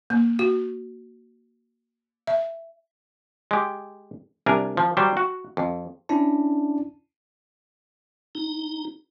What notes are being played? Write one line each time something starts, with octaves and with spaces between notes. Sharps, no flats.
A#3
F#4
E5
G#3 G4
C2 D4 A#4 G#5
F3
F#3 G3 G4 C5
F#4
F2
C#4 D4 E4 D5 A5
D#4